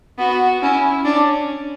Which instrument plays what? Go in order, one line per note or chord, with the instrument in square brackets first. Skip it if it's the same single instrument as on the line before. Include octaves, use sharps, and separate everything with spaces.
[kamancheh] B3 [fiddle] F#4
[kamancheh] C#4 [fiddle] E4
[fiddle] C#4 [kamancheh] D4